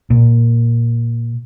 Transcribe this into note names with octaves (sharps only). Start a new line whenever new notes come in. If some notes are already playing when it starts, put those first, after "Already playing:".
A#2